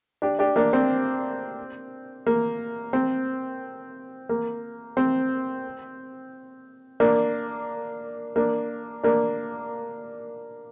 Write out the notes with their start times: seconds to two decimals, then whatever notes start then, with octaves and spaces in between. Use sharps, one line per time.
0.22 D4 G4
0.39 D4 G4
0.56 A#3 D4
0.73 C4
2.27 A#3
2.93 C4
4.29 A#3
4.97 C4
7.00 A#3 D4
8.36 A#3 D4
9.03 A#3 D4